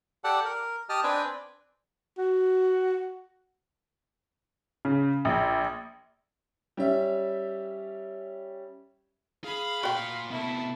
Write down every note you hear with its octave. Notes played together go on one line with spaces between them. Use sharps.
G4 A4 D5 F#5 A5
A#4
G4 D#5 A5 D#6 F6
C4 D4 B4 D5 G5 G#5
F#4
C#3
A#1
G3 C#4 E5
G#4 F5 B5
A#2 F#4 G5 C6
C3 A3 B3 E4